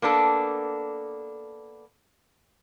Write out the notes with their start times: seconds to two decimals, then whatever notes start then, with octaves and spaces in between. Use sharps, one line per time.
0.02 A#3 B3 D4 A4